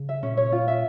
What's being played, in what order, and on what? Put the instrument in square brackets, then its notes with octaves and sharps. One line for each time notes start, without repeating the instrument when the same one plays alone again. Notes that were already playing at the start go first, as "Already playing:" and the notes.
Already playing: [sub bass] C#3
[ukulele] E5
[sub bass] A#2 [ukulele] C#4
[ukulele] C#5
F4
E5